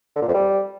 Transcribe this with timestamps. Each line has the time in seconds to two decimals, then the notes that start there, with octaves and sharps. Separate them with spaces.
0.16 D3
0.22 A#2
0.28 F2
0.34 G3